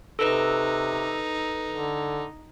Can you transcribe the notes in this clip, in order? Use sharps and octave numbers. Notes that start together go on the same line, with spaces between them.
C3 D#4 A4 B4
D3